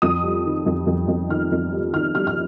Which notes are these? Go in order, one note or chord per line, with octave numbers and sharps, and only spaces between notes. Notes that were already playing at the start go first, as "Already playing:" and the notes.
F2 D#6
G3
D#3
F2
F2
F2
D#3 F6
F2
G3
D#3 F6
G3 F6
F6